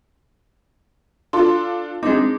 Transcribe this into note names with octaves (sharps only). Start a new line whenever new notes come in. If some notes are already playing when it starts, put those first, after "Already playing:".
D4 F4 A4 C6
G#3 C4 D4 D#4 D6